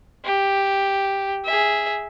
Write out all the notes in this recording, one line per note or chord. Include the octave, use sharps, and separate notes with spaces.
G4
G#4 E5